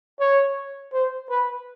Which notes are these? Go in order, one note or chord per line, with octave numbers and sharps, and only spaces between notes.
C#5
C5
B4